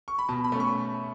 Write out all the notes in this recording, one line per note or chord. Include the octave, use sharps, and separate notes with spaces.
C#6
B5
B2 A5
B5
A3 C#4
C#6